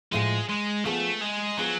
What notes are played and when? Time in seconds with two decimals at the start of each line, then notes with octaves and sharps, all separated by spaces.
0.12 A2 F3 G#3 A3 F4 G#4
0.49 G#3
0.85 F3 A3 B3 F4 G#4
1.22 G#3
1.57 F3 F#3 B3 F4 G#4